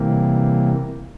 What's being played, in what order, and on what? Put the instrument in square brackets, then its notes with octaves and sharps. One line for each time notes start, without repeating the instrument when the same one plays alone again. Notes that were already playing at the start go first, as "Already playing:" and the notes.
Already playing: [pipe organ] C3 E3 G3 A#3